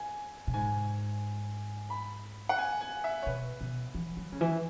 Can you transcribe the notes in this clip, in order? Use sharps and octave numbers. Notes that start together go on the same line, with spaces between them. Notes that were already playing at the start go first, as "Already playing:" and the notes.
Already playing: G#5
B2
G#2 G#5
B5
F#5
G#5
G#5
E5
C#5
B2 B4
B2
E3
F#3
C#3
E3